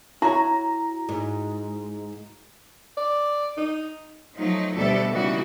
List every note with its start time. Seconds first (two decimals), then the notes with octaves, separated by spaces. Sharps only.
0.22 E4 F#4 C#5 A#5
1.09 G#2
2.97 D5
3.57 D#4
4.36 F3 F#3 A3 D#4
4.76 D2 B2 G3 D4 A4 E5
5.10 C#3 E3 G3 A#3 D#4 F#4